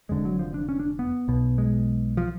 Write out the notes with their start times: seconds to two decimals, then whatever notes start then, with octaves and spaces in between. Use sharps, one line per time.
0.09 F1 F2 D3 G#3
0.25 F#3
0.39 F3
0.54 D4
0.69 C#4
0.79 D4
0.99 B3
1.28 B1 B2
1.58 G#3
2.17 F3